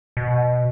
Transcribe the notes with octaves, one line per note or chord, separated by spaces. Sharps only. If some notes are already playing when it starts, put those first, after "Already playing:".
B2